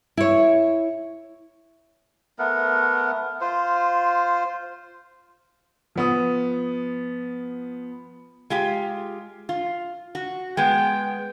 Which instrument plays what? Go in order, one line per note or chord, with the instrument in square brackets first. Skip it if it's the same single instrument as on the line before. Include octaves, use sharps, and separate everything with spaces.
[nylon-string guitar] E4 C#5
[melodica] A3 B3 A#4 F#5
F4 C5
[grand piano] F3 B3 D#6
[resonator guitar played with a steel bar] G#3 F4 G4
F4
F#4
[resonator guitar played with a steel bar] G#3 B3 [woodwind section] G5